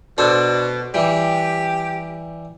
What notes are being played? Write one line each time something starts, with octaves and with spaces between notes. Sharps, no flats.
B2 D4 A4 C5
E3 G3 G4